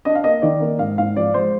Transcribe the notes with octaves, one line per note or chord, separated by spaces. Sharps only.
D4 D#5
F5
A#3 D#5
D#3 D5
A#3
G#2 F5
G#2 F5
F3 D5
G#3 C5